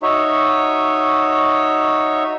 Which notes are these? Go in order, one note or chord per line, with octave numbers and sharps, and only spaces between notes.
D#4 F#4 C#5 E5